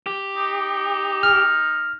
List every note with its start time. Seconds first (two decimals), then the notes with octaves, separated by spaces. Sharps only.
0.06 G4
0.36 D#4
1.23 F6